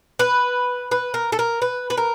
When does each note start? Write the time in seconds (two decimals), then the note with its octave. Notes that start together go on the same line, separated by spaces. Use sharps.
0.19 B4
0.91 B4
1.14 A#4
1.32 A4
1.39 A#4
1.62 B4
1.90 B4
1.97 A#4